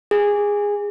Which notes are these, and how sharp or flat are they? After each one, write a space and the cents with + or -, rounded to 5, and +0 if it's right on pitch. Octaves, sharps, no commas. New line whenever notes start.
G#4 -15